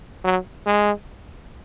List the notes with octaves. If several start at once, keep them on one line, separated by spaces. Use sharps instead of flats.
F#3
G#3